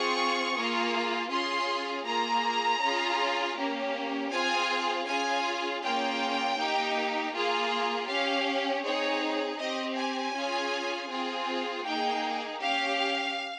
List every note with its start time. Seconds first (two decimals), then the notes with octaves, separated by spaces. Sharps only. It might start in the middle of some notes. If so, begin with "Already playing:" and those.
Already playing: C4 F4 G#4 C#6
0.55 A#3 F4 G#4
1.30 C#4 F4 G#4 C6
2.06 A#3 F4 G#4 A#5
2.81 C#4 F4 G#4
3.57 A#3 C#4 G4
4.32 C4 F4 G#4 G#5
5.07 C#4 F4 G#4 G#5
5.82 A#3 C#4 F4 G#4 G5
6.58 A#3 D#4 G4
7.33 A#3 F4 G#4
8.08 C#4 G4 F5
8.84 C4 D#4 G#4 C#5
9.59 C4 G4 D#5
9.97 G#5
10.35 C#4 F4 G#4
11.10 C4 F4 G#4
11.85 A#3 D#4 G#4 G5
12.60 C#4 G4 F5